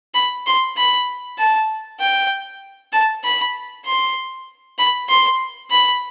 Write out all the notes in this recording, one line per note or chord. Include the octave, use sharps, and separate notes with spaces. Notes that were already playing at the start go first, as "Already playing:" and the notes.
B5
C6
B5
A5
G5
A5
B5
C6
B5
C6
B5